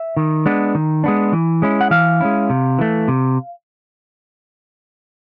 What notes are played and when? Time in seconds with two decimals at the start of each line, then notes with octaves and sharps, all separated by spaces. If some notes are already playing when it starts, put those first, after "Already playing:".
Already playing: E5
0.17 D#3
0.46 G#3 B3 D4
0.75 D#3
1.04 G#3 B3 D4
1.33 E3
1.62 G#3 C#4 E4
1.81 F#5
1.91 E3 F5
2.20 G#3 C#4 E4
2.50 C3
2.79 E3 A3
3.08 C3